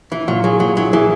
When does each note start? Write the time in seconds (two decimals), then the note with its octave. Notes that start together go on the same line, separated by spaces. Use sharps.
0.11 E3 E4
0.28 A#2 F#3
0.44 F#3 G#4
0.60 A#2 F#3
0.77 F#3 E4
0.93 E3 G#4